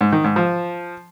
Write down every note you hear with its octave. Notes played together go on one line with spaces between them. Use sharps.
G#2
D#3
G#2
F3